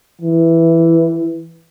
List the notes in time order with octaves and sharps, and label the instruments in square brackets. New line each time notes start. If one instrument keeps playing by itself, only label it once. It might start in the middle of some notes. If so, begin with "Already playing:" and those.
[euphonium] E3